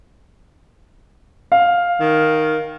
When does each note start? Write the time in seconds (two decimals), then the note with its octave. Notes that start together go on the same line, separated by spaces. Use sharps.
1.52 F5
2.00 D#3